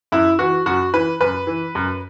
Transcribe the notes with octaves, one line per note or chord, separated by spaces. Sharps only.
F#2 E4
E3 F#4
F#2 F#4
E3 B4
F#2 B4
E3
F#2